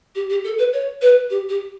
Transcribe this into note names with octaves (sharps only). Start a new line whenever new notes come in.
G4
G4
A4
B4
C#5
B4
G4
G4